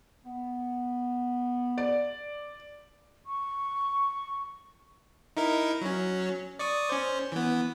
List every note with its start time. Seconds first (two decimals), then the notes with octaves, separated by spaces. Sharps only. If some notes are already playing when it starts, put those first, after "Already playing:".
0.25 B3
1.78 D5
3.25 C#6
5.37 D#4 E4 A#4
5.81 F#3 C#4
6.59 D5 C#6 D#6
6.89 C#4 C5
7.32 E3 B3